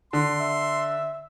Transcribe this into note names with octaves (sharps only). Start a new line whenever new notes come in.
D3 C6
E5